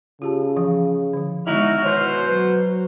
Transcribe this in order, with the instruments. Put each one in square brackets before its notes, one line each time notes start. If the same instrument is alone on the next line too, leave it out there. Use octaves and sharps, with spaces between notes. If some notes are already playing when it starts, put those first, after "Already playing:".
[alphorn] C#3 [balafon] F4 G4 A5
[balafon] E3 F3 F5
D3 F3
[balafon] D#3 G#3 B3 [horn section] D#4 E4 F#4 [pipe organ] F6
[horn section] B2 C5 [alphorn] C#5
[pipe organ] F#3 [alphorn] B4